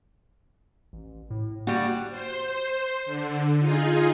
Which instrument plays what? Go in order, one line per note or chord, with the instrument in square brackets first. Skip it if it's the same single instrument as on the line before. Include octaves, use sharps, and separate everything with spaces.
[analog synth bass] A1
A2
[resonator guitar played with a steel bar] G3 F#4 [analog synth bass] A#3
[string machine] C5
D3
D#4 F4 G#4